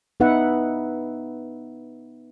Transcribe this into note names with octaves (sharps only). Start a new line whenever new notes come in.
B3 D#4 B4 E5 F#5